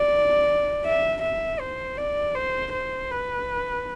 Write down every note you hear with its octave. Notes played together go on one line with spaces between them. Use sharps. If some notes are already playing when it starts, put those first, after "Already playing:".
Already playing: D5
E5
E5
C5
D5
C5
C5
B4